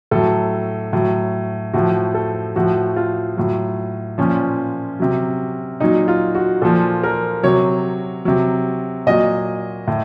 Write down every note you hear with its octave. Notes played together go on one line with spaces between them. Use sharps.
A2 F#3 A4
A2 F#3
A2 F3 F#4
A4
A2 F3 F#4
F4
A2 F#3
A#2 F3 C#4
C3 F#3
A#2 F#3 D#4
F4
F#4
A#2 F3 A4
A#4
C3 F#3 C#5
C3 F#3
A#2 F#3 D#5
A2